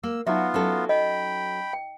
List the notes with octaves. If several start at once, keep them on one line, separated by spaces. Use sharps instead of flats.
A#3 E6
F#3 B3 D#4 F4 F#4 E5
F#3 C#4 A4
D#5 G5 B5
G5